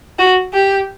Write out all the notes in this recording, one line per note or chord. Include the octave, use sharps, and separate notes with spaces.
F#4
G4